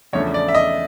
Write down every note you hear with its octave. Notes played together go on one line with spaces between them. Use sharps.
E2 C#3 F3 A3 D4 C#5
D5
E5
D#5